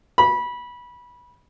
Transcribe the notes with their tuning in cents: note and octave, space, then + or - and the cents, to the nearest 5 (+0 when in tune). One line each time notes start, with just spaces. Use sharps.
B5 -20